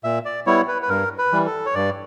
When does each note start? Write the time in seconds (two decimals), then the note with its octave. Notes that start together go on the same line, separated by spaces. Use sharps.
0.04 A#2 E5
0.25 D5
0.46 G3 B3 E4 C#5
0.68 B4
0.82 B4
0.89 G2 A#4
1.18 B4
1.32 E3 G3
1.46 A4
1.66 C#5
1.75 G2 D5